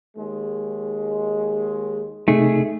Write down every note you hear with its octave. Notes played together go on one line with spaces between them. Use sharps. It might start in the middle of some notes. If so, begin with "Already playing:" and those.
D#2 G#3
C3 A3 D#4 G#4